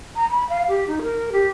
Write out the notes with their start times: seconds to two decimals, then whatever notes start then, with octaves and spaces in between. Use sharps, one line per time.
0.16 A#5
0.30 B5
0.49 F5
0.68 G4
0.88 D#4
1.02 A#4
1.32 G4